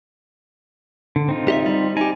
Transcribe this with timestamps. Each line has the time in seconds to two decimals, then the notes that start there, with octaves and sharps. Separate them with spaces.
1.16 D3
1.29 C4 D#4 F4
1.48 G4 D#5 E5
1.66 G3
1.97 D#4 G4 G#5